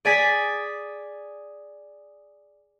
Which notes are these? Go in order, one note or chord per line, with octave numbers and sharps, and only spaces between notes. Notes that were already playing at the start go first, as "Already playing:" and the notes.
G#4 D5 G#5 A6 B6